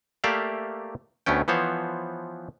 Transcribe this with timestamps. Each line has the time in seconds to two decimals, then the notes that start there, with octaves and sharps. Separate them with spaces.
0.24 A3 A#3 G4 D5 E5 F5
1.26 D2 A3 B3 C#4 G5
1.48 E3 F3 B3 C5 C#5